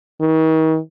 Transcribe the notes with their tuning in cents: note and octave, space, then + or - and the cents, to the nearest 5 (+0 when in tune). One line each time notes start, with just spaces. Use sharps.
D#3 +40